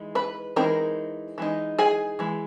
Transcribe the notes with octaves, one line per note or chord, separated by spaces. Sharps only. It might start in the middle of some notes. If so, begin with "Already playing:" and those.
Already playing: E3 G#3 D#4
B4 B5
E3 G#3 C4 D#4 A#4 A#5
E3 G#3 D#4
G#4 G#5
E3 G#3